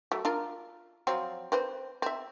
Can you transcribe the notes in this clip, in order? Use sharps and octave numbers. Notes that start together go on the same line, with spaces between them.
F#3 A3
D4 F4 A#4
F3 F#3 C4
C4 B4 C5
C4 E5